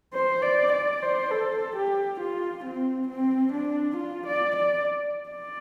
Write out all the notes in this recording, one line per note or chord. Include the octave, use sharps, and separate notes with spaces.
C5
D5
D5
C5
A4
G4
F4
C4
C4
D4
F4
D5
D5
D5